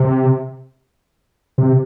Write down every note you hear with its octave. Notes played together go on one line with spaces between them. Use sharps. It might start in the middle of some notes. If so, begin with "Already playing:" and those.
Already playing: C3
C3